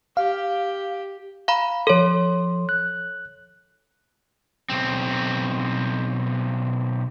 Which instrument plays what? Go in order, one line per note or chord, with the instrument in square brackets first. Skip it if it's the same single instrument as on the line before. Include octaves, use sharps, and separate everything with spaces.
[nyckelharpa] G4 [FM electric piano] F5
[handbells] F5 A#5 B5
[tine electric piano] F3 C6 [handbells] A4 C#5
[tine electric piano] F#6
[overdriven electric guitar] B1 C4